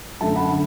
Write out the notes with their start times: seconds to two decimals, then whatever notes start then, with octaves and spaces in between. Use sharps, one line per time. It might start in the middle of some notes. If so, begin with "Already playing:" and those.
0.21 F#2 D3 A3 E5 A5
0.36 F#5 B5
0.51 D3